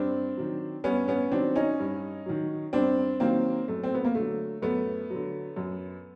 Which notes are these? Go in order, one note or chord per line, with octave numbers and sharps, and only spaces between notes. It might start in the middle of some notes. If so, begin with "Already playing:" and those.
Already playing: G2 C4 D4
D#3 F#3
G2 B3 C#4
B3 C#4
D#3 F#3 C4 D4
C#4 D#4
G2
D#3 F#3
G2 C4 D4
D#3 F#3 A#3 C4
F#2 A3
C4
B3
A#3
D3 F#3 A3
F#2 A3 B3
D3 F#3
F#2